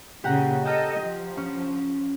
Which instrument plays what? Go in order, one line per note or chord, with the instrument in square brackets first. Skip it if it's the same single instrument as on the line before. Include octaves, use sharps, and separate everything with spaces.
[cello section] A#2 C#3 [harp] G4 F#5 A#5
[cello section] A4 D#5 [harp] G5 A#5 F6
[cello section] F3
[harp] C#4